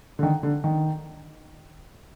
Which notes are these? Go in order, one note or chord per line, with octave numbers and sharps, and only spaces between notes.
D3
D#3
D3
D#3